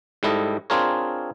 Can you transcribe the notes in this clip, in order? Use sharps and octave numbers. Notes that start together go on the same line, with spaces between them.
G#2 G3 E4 A4 D#5
C4 D4 F4 G#4 A#4 C#5